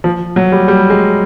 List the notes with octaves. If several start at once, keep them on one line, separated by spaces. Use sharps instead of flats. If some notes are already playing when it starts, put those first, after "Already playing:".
F3
F#3
G3
G3
G#3